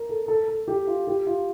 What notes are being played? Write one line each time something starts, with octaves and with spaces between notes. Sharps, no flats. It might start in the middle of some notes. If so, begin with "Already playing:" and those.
Already playing: A#4
A4
A4
A4
G4
F4
G4
F4